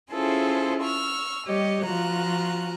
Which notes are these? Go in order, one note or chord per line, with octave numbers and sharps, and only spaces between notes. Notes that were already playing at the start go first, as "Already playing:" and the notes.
C#4 E4 F4 G#4 A4 C5
C#6 E6 F6
G3 G4 C#5 D#5
F3 F4 F#4 A#5 F#6